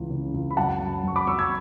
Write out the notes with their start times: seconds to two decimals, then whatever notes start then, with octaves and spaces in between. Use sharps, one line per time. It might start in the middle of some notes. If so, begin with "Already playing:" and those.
Already playing: C#2 E3
0.10 C#3
0.34 C#2
0.51 B5
0.57 F#2 F#5 A5
0.80 F#2
1.03 F#2 C#6
1.16 B5 D6
1.27 F#2 C#6 E6
1.39 E6 G#6